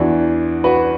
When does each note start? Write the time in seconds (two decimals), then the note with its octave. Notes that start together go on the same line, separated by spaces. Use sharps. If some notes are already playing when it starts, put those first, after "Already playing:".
Already playing: E2 E3 D4 F#4
0.64 F#4 B4